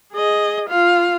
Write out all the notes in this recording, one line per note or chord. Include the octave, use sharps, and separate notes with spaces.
G#4 D#5
F4 F5